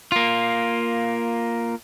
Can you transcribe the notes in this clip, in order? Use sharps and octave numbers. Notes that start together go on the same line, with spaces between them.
A#3 F4